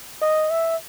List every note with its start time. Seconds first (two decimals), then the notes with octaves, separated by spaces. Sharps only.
0.21 D#5
0.50 E5